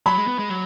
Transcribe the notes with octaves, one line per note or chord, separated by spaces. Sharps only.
F#3 B5
G#3
B3
G#3
F#3